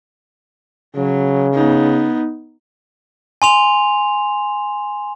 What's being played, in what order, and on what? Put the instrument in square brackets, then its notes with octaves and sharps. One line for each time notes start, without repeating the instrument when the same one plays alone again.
[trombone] C#3 [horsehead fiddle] F#3
[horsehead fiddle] B3 D#4
[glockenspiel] G#5 C6 F7